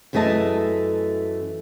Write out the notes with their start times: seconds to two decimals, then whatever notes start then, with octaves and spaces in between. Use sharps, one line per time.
0.13 F#2 E3 A3 G#4 D#5 A5